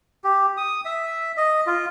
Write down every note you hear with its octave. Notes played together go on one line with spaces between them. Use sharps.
G4
D#6
E5
D#5
F4